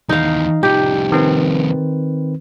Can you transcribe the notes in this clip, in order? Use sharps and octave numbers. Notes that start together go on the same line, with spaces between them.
D#2 E3 D#4 F5
C2 F3 G4
D#3 C4 B4